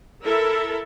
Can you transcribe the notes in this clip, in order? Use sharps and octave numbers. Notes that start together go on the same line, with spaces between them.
E4 A4 A#4 E5